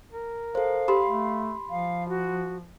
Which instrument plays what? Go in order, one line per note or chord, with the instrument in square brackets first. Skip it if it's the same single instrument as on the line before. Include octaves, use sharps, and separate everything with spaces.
[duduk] A#4
[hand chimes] A4 C5 [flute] F5
[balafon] G4 [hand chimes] B5 C6
[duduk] A3
[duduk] F3 [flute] F5
[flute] F#4